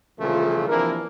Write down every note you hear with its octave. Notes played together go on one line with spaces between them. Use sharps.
C2 A#2 C#3 E3 F3 A3
C3 E3 F3 A#3 D4 A#4